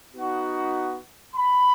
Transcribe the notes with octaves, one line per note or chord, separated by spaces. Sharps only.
B3 D#4 F#4
B5